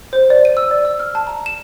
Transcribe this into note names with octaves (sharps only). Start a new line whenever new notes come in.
C5
D5
D#7
E6
D5
E6
F6
A5
A#5
E7